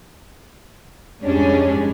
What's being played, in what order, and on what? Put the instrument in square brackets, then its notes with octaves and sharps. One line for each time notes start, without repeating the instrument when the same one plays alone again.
[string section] F2 G#2 G3 G#3 C#4 D4